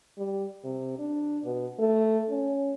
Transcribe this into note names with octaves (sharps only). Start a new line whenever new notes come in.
G3
C3
D4
B2
A3
C#4